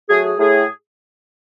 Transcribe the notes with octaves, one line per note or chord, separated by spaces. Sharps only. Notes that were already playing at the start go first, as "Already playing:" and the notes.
F#3 A3 G#4
G#4
A2 G#4